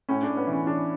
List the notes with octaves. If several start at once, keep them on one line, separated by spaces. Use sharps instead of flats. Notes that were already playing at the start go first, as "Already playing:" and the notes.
A2 C#4
A2 D4
B3
E3
C#4
E3 D4